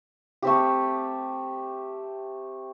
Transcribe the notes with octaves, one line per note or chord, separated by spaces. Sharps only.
A3 C4 G4